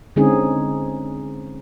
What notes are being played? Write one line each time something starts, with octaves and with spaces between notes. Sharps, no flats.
D3 G#3 C4 C#4 D#4 G#4